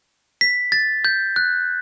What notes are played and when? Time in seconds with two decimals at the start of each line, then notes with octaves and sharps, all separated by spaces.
0.41 B6
0.72 A6
1.05 G6
1.36 F#6